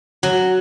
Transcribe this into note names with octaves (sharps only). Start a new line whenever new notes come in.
F#3